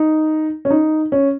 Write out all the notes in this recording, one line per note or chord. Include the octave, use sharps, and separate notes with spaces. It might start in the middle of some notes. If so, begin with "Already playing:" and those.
Already playing: D#4
C#4
D#4
C#4